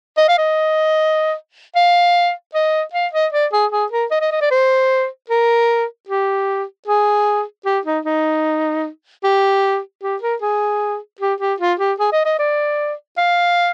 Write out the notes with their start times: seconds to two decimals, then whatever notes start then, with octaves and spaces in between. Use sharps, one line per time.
0.17 D#5
0.28 F5
0.38 D#5
1.75 F5
2.54 D#5
2.93 F5
3.13 D#5
3.32 D5
3.52 G#4
3.71 G#4
3.91 A#4
4.11 D#5
4.21 D#5
4.31 D#5
4.41 D5
4.51 C5
5.30 A#4
6.08 G4
6.87 G#4
7.65 G4
7.85 D#4
8.05 D#4
9.24 G4
10.03 G4
10.22 A#4
10.42 G#4
11.20 G4
11.40 G4
11.60 F4
11.79 G4
11.99 G#4
12.12 D#5
12.25 D#5
12.39 D5
13.17 F5